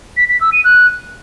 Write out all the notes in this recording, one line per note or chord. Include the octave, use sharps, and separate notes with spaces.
B6
B6
E6
D#7
F#6